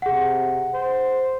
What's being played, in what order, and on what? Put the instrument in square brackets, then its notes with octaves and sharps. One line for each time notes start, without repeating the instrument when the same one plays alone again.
[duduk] C3 [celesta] G#4 F#5
[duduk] C5